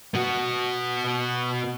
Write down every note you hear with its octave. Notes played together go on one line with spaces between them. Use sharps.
B2 F#4